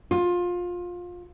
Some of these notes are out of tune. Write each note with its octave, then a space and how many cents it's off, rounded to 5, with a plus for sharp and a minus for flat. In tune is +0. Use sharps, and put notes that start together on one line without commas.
F4 +20